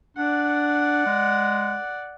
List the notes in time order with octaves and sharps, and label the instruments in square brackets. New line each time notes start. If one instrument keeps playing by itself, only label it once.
[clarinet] D4 [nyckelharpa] D5 F#5
[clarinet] G#3